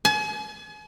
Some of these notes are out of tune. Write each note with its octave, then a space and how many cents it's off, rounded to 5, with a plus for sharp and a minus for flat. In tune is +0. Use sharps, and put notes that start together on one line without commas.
G#5 +40